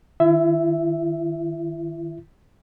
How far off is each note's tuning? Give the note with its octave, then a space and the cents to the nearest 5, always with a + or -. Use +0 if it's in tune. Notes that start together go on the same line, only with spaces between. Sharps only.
D#3 +0 E4 +40 E5 +0